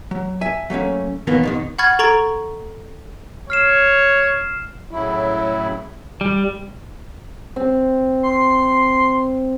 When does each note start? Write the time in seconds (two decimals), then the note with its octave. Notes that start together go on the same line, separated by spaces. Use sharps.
0.11 F#3
0.41 E5 G#5
0.70 F#3 A3 A#3 C#4
1.27 B2 D#3 E3 F#3 A#3 B3
1.43 F2 B2 D#3
1.79 F#5 B5 C#6 F6 G#6 A6
1.99 A4 A#5 C#6 G#6 A6 D7
3.50 C#5 F6 C7 E7
4.91 A2 C#3 F#3 E4
6.21 G3
7.56 C4
8.23 C6